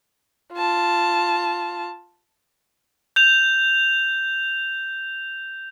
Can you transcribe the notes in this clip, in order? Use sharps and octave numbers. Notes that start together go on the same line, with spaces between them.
F4 A5
G6 F7